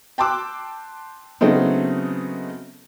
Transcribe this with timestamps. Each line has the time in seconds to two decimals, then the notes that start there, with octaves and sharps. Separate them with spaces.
0.18 G5 A5 C6 D6 E6 F#6
1.41 C#3 F#3 A3 B3 C4 D#4